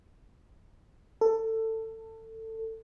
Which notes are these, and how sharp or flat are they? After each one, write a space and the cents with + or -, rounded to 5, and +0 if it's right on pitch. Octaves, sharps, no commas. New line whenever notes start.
A4 +20